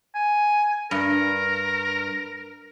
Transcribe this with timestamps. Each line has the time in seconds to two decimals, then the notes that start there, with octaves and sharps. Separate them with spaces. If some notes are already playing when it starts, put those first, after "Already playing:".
0.15 G#5
0.91 G2 A#4